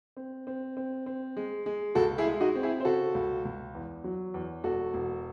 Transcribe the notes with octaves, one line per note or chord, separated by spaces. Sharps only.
C4
C4
C4
C4
G#3
G#3
C#2 F#4 A4
E4 G#4
G#3
D#4 F#4
C4
E4 G#4
C5
C#3 F#4 A4
C#2
C#2
E2
F#3
E2
E1 F#4 A4
E1